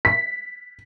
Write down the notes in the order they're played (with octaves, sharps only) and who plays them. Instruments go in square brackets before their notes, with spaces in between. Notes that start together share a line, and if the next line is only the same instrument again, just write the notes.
[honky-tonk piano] B6